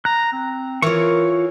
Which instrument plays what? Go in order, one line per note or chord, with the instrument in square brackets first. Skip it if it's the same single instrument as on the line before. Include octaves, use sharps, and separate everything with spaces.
[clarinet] A#5 [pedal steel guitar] F#6
[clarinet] C4
[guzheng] E3 C#5 [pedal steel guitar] F4 C#6 [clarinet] A#4